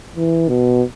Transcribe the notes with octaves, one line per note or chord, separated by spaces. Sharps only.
E3
B2